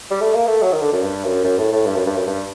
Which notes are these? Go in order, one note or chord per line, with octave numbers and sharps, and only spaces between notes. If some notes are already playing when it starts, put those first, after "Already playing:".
G3
A3
A#3
A3
F#3
D#3
D3
F#2
G2
F#2
F#2
A2
A2
G2
F#2
G2
F#2
G2